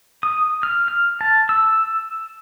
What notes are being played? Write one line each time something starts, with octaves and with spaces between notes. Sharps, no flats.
D#6
F6
F6
A5
E6